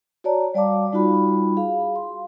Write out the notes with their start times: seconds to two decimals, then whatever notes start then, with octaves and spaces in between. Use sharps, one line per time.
0.24 F#4 C#5 D5 A5 A#5
0.54 G3 D5 F5 A5 D6
0.92 G3 D#4 F4 F#4 B5
1.57 G#4 F5
1.96 C6